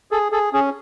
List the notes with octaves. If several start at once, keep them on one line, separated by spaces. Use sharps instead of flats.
G#4 A4
G#4 A4
C#4 G#4